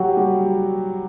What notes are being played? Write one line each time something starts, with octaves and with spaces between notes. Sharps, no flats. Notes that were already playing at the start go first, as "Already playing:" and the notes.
Already playing: F#3 F#4 G4
G3 G4